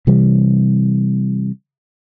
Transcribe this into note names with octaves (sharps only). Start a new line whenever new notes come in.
C3 E3 G3